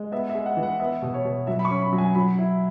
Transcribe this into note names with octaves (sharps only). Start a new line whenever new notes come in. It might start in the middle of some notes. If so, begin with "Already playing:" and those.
Already playing: G#3
B3 E5
E5
G#3
F#5
E3
F#5
B3 E5
B2
C#5
B2
F#3 E5
B5
C#6
C#4
B5
F#3
G#5
F#3 B5
E4